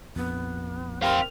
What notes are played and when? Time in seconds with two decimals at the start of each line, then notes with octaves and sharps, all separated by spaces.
0.16 A#1 F2 B3
1.03 C4 G4 A#4 F5